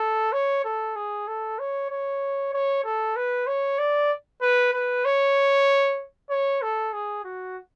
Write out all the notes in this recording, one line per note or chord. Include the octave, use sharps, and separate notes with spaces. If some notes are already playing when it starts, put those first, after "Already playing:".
Already playing: A4
C#5
A4
G#4
A4
C#5
C#5
C#5
A4
B4
C#5
D5
B4
B4
C#5
C#5
A4
G#4
F#4